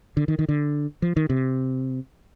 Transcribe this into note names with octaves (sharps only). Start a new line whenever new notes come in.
D3
D#3
D#3
D3
F3
D#3
C3